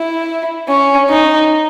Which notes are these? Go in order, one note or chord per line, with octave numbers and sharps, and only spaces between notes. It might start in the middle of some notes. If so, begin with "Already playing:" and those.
Already playing: E4
C#4
D#4